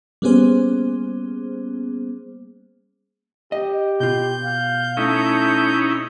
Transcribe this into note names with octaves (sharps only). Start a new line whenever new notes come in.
G3 A#3 B3 C#4 G#4 C5
G4 D#5
B2 F4 G6
F5
A3 C#4 D#4 E4